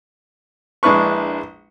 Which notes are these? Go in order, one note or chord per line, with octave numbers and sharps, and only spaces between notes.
A#1 G#3 D4 E4 B4 C#6